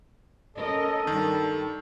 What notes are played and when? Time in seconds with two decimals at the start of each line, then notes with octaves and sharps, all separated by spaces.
0.56 C#4 A4 A#4 D#5
1.07 G2 D#3 G3